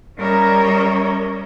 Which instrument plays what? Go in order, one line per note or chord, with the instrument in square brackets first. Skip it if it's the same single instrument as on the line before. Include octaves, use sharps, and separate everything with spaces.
[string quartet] G3 C#4 A#4 C#5 D#5 E5